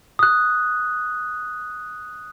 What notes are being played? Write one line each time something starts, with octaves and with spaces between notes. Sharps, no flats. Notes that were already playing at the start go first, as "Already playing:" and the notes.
D#6 F#6